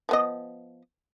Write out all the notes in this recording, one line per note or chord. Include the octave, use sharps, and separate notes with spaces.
F3 B3 D#5